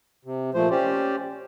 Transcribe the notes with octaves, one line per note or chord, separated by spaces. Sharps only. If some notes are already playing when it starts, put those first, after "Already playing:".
C3
A#2 F3 A3 C5
C#4 G4 C5 D5